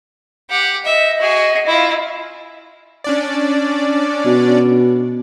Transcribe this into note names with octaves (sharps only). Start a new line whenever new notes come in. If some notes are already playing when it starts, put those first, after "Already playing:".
G4 F#5
D#5 E5
F#4 G#4
E4 F4
C#4 D4 D5
B2